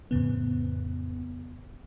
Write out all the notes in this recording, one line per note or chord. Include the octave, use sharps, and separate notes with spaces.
F2 A2 C#3 B3